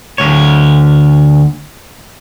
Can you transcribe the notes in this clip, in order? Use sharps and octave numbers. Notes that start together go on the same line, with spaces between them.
D2 C#5